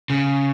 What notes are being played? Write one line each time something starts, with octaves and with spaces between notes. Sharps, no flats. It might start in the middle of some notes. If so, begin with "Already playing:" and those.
C#3